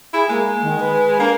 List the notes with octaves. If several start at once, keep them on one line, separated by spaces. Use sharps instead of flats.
E4 G#4
G#3 A#3
D#3
B4
A#3 D4